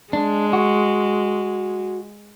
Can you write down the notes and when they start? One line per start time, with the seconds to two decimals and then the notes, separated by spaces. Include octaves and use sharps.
0.13 G#3 D4
0.53 F#4